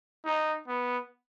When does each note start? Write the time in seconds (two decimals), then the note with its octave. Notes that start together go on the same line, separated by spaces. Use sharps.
0.25 D#4
0.68 B3